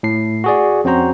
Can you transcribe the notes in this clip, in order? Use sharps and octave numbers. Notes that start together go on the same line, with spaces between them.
A2 C7
F#4 G#4 D5
F2 C4 C#4 F#4 C5 A#5